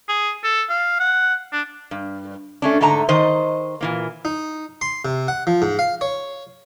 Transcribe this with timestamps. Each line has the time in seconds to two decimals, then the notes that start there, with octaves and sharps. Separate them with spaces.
0.09 G#4
0.44 A4
0.70 F5
1.00 F#5
1.52 D4
1.91 G2
2.62 A3 C#4 D4
2.81 G#2 D3 A3 A5 A#5
3.09 D#3 C5 D#5
3.81 A#2 E3 A#3
4.25 D#4
4.81 C6
5.05 C3
5.28 F#5
5.47 F3
5.62 G#2
5.79 F5
6.01 C#5